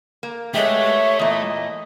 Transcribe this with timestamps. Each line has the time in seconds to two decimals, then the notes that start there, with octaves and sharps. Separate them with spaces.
0.23 A#3
0.54 G#3 A3 B3 G4 C#5 E5
1.19 E2 A#2 D#5